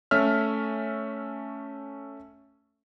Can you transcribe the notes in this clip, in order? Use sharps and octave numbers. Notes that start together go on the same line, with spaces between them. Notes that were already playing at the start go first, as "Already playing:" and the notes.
A3 C#4 E5 F6